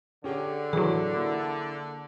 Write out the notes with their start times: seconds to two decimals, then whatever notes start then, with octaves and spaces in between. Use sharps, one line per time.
0.24 D3 C#4 G4 G#4
0.73 A2 E3 F#3 G#4
1.13 A#3 E4